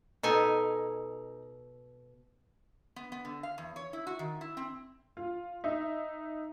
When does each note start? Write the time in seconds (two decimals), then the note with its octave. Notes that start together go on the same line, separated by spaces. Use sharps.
0.23 B2 D#4 A4 G#5
2.96 B3
3.12 B3
3.25 D3
3.43 F5
3.58 E2
3.76 C#5
3.93 E4
4.07 F#4
4.19 D#3
4.41 E4
4.57 C4
5.17 F4
5.64 D#4 E5